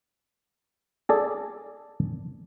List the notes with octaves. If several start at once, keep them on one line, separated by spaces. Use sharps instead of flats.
G#4 A4 D5